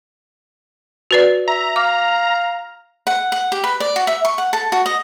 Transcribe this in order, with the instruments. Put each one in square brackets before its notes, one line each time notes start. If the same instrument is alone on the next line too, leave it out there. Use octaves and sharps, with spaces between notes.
[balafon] F#4 B4 D5
[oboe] E5 [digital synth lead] A#5
[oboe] F5 [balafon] D6
[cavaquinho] F#5
F#5
G4
B4
D5
F#4
E5
C#6
F#5
A4
F#4
D#5